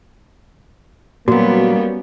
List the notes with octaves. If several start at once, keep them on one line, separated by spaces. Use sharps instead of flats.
A#2 F#3 G3 A#3 B3 C#4 F#4